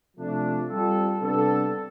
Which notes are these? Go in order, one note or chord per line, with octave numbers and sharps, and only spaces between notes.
C3 F3 A3 D4
G3 C4 F4 A4
C3 G3 B3 D4 A4